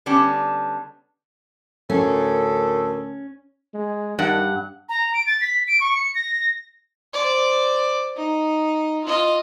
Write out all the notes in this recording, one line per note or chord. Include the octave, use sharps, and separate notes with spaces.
D3 G3 B3 C#4 D4
D2 A2 C#4 A4 A#4
G#3
G2 D#3 F#5
A#5
D7
A6
B6
D7
C#6
C#7
A#6
C5 D5
D#4
F4 D#5